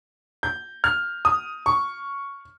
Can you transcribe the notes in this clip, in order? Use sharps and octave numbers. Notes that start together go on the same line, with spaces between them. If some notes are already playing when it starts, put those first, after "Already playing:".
G6
F6
D#6
C#6